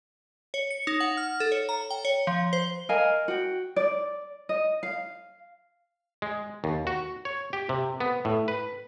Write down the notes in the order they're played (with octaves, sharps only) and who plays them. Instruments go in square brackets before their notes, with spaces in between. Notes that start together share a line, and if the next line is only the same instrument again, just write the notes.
[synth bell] C#5
C#7
D#4
F#5
F6
A4
C#5
A#5
G5
C#5
F3
C5
[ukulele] A#4 D#5 F5 G#5
F#4 G5
D5
D#5
F5
[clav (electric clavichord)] G#3
D#2
F#4
C#5
G4
C3
B3
A2
B4